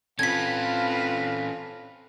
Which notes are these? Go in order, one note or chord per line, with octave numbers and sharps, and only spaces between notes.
C4 C#4 F4 A4 B4 F5 G#6 B6